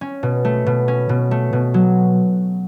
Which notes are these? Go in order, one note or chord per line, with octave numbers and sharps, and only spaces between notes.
C#4
B2
A3
B2
C#4
B2
A3
B2
F#3